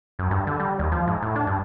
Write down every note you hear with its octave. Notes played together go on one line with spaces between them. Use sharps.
F#2
G2
D3
G3
D#2
F3
G#2
A2
D4
G2